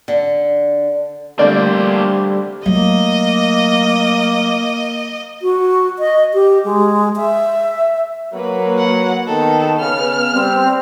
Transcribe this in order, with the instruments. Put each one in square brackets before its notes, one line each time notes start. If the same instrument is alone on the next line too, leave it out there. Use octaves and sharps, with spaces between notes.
[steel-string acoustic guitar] D3
[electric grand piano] D3 A3 C4 [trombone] G3 [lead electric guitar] A#3 C5 [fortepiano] D5
[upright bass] F#3 A3 [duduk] A#3 [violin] D#5
[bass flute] F#4
D#5
G4
G#3
E5
[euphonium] F#3 [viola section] A#3 F#4 B4
[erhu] F#5
[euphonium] D#3 [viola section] B3 [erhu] A4
[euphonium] C#3 [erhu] F6
[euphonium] G3 [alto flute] C4